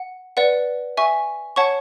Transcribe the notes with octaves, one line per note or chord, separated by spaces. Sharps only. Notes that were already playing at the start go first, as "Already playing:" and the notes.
Already playing: F#5
B4 D5 F#5
E5 G#5 C#6
C#5 F#5 A5 C#6